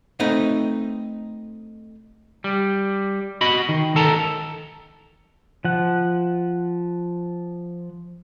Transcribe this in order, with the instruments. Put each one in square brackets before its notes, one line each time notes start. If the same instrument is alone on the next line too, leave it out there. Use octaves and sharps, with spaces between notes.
[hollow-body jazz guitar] A3 C4 D#4 B4 D#5
[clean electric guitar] G3
F#4 D#5 B5
D#3
D#3 A4 A5 A#5
[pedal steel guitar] F3 F#5